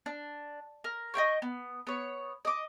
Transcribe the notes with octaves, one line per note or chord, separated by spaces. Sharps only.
D4
A#4
D#5 E5 G5 C#6
B3
B3 C#5
D#5 D6